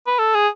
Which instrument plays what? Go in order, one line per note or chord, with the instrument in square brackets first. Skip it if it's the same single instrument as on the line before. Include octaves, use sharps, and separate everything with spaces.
[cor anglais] B4
A4
G#4